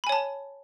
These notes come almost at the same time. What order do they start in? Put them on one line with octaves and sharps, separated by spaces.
B5 G#5 C#5 A5